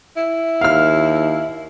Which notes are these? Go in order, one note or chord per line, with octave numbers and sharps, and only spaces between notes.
E4
D#2 F5 F6